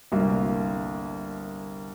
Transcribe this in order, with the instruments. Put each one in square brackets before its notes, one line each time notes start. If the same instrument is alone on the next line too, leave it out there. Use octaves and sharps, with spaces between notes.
[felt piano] G1 C2 A#3